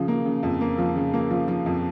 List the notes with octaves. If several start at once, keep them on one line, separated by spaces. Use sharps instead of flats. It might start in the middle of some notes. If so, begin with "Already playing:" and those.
Already playing: C#3 F3
A#3
C#3
F2
A#3
F3
C#3
A#3
F3
F3
F2